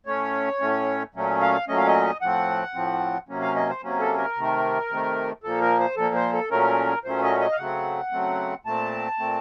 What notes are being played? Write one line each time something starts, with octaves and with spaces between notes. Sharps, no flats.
A2 A3 C#4 C#5
A2 A3 C#4
A#2 F#3 A3 C#4
F5
A#2 F#3 A3 C#4 D#5
F5
D#5
A2 F3 C4 F#5
A2 F3 C4
C3 F#3 A#3 C#4
F5
D#5
C5
C3 F#3 A#3 C#4
A4
A#4
C3 D#3 A3
C3 D#3 A3
A#2 F3 A#3 A4
A#4
C5
A#2 F3 A#3 A4
C5
A4
A#2 F#3 A3 C#4 A#4
A#2 F#3 A3 C#4 C5
D#5
D#5
F5
C#3 F#3 A3 C4 F#5
C#3 F#3 A3 C4
A#2 A3 C4 A5
A#2 A3 C4